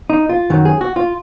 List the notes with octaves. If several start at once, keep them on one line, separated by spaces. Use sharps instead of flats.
D#4
F4
F#2 D#3 F#3
G#4
F#4
F4